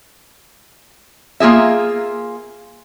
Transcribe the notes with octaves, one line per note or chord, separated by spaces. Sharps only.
A#3 F4 G#4 E5